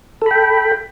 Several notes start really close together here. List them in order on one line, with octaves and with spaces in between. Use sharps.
A4 B5 G5